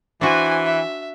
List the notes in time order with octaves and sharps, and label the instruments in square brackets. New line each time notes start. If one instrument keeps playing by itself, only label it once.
[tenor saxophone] E3 [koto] D4 F#4 [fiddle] C5 G#5
[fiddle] E5